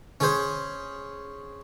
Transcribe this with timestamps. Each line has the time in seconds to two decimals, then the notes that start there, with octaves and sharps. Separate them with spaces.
0.20 C#4 G#4 C5